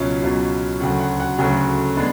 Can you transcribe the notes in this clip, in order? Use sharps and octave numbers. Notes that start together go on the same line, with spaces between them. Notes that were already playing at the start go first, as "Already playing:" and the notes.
Already playing: C#2 B2 F#3 C#4 F4 F5
C#2 B2 F#3 C#4 F4
D2 C#3 F#3 A3 F#5
F#5
F#5
D2 C#3 F#3 A3
G#3 B3 D4